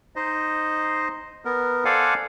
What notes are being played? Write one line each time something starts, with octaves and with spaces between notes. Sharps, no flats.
D#4 C5 D#5
B3 A#4
A4 C5 D5 F5 F#5 G#5